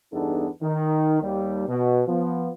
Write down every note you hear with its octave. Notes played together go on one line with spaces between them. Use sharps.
E2 G2 B3 D4 D#4 A4
D#3
D#2 G3
B2
F3 B3